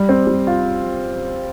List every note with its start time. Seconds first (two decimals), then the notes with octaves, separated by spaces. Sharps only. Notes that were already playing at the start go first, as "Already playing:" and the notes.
Already playing: G3
0.09 C4
0.27 G3
0.47 F4